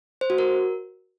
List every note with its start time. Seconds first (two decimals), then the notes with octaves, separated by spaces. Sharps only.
0.21 C5
0.30 F#4
0.38 A#4